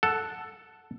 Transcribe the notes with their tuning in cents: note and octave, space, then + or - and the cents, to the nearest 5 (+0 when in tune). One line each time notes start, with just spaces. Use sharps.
A4 +0 F#5 +0